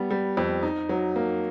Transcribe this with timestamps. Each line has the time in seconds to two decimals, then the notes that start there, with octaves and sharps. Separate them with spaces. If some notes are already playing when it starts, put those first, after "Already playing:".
Already playing: G3 B3
0.11 G3
0.37 F2
0.63 D#4
0.89 F#3
1.16 A#3